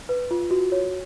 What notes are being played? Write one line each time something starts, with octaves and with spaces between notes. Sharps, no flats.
B4
F4
F#4
C#5